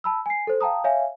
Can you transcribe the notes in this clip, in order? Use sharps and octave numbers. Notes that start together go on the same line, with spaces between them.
A5 B5 E6
G#5 C7
A4 C5
F5 G5 A5 A#5 D#6
C#5 E5 F5 G#5